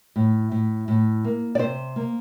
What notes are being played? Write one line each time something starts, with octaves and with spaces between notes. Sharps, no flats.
A2
A2
A2
A#3
D5
C3 C5
A#3